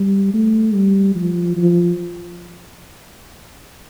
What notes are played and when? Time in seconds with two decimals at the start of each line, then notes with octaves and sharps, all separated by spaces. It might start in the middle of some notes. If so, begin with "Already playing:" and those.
Already playing: G3
0.34 A3
0.74 G3
1.15 F3
1.57 F3